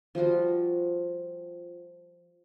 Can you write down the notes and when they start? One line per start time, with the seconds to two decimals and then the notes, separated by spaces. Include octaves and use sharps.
0.15 F3 G3 F4 F#4